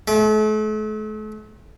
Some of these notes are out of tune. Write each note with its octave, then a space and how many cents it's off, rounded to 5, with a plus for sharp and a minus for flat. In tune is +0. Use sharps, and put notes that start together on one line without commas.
A3 -40